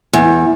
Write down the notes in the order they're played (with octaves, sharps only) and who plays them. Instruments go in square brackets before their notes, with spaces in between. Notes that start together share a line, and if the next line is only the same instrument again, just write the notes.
[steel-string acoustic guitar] E2